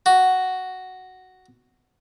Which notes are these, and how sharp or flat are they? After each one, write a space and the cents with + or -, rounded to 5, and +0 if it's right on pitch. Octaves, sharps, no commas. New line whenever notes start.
F#4 +5